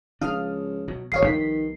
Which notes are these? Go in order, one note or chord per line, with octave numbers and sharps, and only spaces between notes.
C#2 F3 D4 F5 D#6 F6
B2 F#3
D#1 F2 F#3 C#5 F5 D#6 C7
C2 D#3 F3 B3 B6